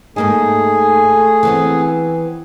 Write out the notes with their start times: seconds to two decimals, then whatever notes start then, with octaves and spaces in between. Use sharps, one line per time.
0.16 G#2 A3 A#3 D#4 G#4
1.43 E3 B3 C4